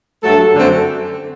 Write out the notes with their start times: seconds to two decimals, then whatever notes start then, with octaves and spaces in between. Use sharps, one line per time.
0.23 G2 F#3 A3 A4
0.55 F#2 D3 A3 C4